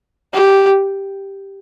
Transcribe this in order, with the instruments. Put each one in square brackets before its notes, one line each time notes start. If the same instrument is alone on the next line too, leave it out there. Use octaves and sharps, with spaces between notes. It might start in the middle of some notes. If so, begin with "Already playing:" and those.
[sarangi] G4